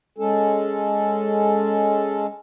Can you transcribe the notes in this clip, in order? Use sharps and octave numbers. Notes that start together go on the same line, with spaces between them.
G#3 C#4 A4